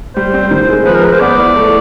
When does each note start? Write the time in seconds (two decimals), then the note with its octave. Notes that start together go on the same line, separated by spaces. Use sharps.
0.15 G3 C5
0.34 C4
0.51 D#3
0.69 G#3
0.85 F3 B4
0.95 A#4
1.03 G#3 B4
1.12 C5
1.21 B3 D5
1.39 E4
1.56 A3